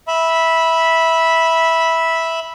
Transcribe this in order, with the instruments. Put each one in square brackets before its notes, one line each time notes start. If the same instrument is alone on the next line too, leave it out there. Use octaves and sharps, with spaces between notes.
[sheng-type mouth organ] E5 B5